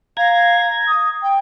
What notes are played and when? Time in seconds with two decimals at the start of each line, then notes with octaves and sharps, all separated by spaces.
0.17 F5 A#5 G#6
0.87 D#6
1.22 G5